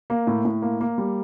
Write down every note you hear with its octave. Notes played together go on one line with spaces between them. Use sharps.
A#3
A2
A2
A#3
A#3
G3